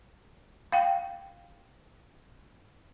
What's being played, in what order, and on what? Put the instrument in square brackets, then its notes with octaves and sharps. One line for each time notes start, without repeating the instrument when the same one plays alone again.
[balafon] F5 G5